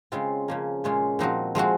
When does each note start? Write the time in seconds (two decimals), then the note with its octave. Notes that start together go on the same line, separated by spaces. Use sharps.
0.12 C#3 G#3 C4 F4
0.48 C#3 F3 A#3
0.84 A#2 G#3 C#4 F4
1.19 A#2 F3 C4 D#4 F#4
1.55 F3 G#3 C4 F#4